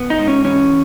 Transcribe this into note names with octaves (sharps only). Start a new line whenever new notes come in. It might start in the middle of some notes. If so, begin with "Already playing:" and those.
Already playing: B3
D#4
G#2
C#4
E3 C#4